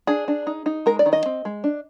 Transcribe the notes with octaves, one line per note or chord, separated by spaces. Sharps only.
D4 G#4
D4
D#4
D#4
G#3 A#4
D5
D#3
D#5
C4
G#3
D4